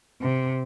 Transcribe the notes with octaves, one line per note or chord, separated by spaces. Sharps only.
C3